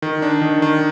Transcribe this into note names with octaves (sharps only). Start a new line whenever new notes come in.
D#3
D4
D#3
D#3